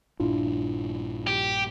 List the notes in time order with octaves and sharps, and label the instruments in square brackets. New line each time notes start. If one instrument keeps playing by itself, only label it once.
[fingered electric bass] A#1 G2 A#2 [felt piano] D4 E4 [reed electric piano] F4
[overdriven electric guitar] G4